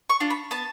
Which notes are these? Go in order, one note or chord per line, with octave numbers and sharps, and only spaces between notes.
C#6
D4 F4
B5
B3 A5